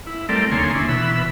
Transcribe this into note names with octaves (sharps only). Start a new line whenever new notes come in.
E4
G3 A3 C4 A4 A#4 D5
D#2 D3 A#3 C#5 G#5 C6
C#4 D4 E4
B2 E3 B5 E6